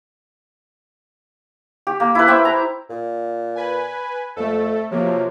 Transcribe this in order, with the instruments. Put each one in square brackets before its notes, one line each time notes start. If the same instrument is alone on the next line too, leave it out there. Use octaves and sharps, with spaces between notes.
[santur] G4
A#3
E4 B4
C5 E5 G5 D6
A#5
[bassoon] A#2
[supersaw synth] B4 G#5
[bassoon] F2 [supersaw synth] A3 A4
[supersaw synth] C3 F3 A#3 [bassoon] F#3